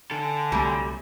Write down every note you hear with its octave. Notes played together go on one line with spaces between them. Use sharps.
D3 A4 G#5
C2 F#3 G3 A3